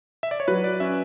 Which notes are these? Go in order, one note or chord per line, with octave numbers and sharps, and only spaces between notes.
E5
D5
C#5
F#3 B4
D5
C#4 E5